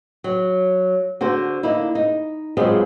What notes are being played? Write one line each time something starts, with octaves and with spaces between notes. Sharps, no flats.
F#3
D3 F#4 A4 C5
D3 A#3 D#4 E4
D#4
G#2 F3 F#3 G#3 B3 C4